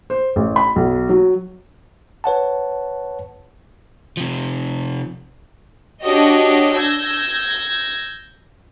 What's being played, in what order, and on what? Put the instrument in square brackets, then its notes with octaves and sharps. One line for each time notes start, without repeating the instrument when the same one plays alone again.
[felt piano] C5
A1
B5
B1
F#3
[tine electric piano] B4 C#5 F#5 A5
[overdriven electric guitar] C3 F3
[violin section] D4 F#4 G4 C#5 D#5
E6 G6 G#6 A#6